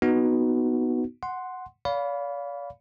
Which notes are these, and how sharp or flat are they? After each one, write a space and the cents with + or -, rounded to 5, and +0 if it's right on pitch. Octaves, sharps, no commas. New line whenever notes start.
B3 +0 D#4 +0 F#4 +0
F#5 +0 C6 +0
D5 -45 F5 +10 B5 +0